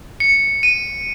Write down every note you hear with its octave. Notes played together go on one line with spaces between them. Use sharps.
C#7
D#7